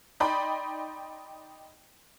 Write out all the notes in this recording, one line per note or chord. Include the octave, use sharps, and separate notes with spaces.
D#4 D5 G5 B5 C6